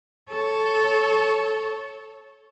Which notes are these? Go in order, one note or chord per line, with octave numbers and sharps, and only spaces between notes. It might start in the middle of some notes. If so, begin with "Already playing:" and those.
A4 C#5